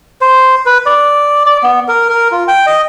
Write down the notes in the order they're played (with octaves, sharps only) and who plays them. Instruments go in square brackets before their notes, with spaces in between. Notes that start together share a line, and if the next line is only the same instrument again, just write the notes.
[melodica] C5
B4
D5
D5
B3
A#4
A#4
F4
G5
D#5